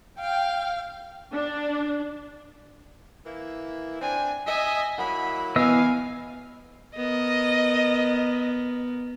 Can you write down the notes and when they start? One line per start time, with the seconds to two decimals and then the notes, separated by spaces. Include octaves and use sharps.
0.19 F5 G5
1.33 D4
3.26 E3 A#3 E4
4.01 C4 D4 G#5
4.47 D#5 E5 G#5
4.98 F#3 A#3 E4 F#5 B5
5.56 E3 B3 D#5 F5 G#5 E6
6.97 B3 A#4 D#5